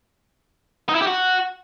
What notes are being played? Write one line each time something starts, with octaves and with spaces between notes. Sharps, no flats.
D#4
E4
G4
F#4